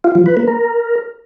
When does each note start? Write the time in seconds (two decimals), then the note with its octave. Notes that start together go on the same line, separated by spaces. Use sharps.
0.04 F4
0.15 F3
0.26 B4
0.37 A#3
0.48 A#4